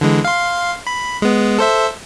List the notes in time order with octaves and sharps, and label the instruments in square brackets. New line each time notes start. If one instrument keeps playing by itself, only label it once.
[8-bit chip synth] D3 E3 G#3
F5 C6
B5
G#3 B3
A4 C5 E5